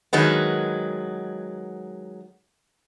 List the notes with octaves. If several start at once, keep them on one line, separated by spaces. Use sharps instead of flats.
D#3 F#3 G#3 B3